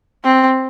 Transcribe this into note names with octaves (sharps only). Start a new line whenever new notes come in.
C4